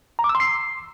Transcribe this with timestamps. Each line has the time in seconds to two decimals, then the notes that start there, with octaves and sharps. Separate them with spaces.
0.19 A#5
0.24 D6
0.29 E6
0.35 C6
0.40 C7